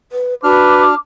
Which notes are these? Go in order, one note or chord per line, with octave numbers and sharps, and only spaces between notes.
B4
D4 F#4 B4 D6 F6